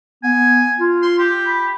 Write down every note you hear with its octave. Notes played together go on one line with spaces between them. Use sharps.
B3 G#5
F4
C6
G4
B5